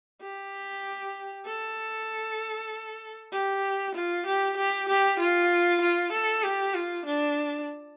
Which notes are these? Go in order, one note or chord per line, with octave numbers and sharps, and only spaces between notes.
G4
A4
G4
F4
G4
G4
G4
F4
F4
A4
G4
F4
D4